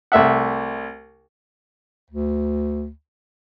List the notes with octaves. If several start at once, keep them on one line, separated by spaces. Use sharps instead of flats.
C2 A3 E5 F#5
D2